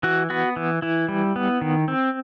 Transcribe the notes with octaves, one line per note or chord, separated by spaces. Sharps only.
E3 F#4
B3 F#4
E3
E3 E4
G3
B3
D#3
C4